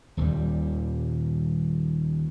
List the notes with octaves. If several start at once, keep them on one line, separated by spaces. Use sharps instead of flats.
D#1 D#2 A#2 G3